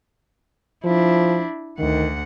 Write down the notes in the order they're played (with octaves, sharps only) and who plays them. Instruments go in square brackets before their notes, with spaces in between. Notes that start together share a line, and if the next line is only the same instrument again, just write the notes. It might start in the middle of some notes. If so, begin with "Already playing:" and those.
[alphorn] F3 [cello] D4 E4
[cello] D2 F#5 [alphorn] D#3